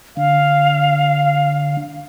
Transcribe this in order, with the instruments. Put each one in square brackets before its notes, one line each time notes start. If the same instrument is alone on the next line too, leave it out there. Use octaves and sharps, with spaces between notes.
[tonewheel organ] D3 [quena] F5